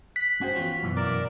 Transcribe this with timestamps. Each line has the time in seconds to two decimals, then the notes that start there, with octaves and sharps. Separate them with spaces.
0.16 F#6 B6
0.41 C#4 F#4 G#4 C5 F#5 G5
0.54 E2 F4 C#5
0.83 F#2 B2 E3
0.96 A#2 A#4 D5 E5 F#5 D6